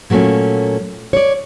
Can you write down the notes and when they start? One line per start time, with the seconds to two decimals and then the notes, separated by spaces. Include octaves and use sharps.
0.10 A#2 F#3 A3 A#3 C#4
1.13 C#5 D5